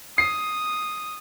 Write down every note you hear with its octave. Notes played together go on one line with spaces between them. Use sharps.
D#6 C7